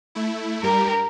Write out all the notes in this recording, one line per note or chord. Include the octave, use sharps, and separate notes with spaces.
A3 E4
G2 G3 G4 A#4